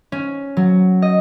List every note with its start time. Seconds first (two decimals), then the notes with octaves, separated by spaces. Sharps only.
0.12 C#4
0.57 F#3
1.02 D#5